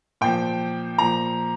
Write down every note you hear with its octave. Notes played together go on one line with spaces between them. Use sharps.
A#2 F3 G5
A#2 F3 A#5